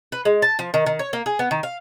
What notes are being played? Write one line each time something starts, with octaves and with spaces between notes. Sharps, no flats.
B4
G#3
A5
F3
D#3
D#3
C#5
A#3
G#4
B3
D#3
F5